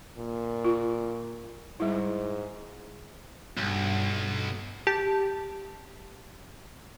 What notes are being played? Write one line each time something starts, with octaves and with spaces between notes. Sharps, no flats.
A#2
F4
G#2 G3 E4
B1 G2
G4 A5